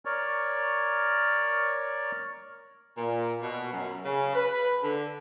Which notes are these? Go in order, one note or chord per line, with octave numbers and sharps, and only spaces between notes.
A#4 C#5 D5
A#2
B2
F#2
C#3
B4
D3